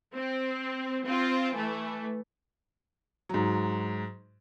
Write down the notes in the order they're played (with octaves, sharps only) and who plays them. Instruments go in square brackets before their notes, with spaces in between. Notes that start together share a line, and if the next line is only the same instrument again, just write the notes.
[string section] C4
C4 F4
E3 A3
[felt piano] G#2 F#3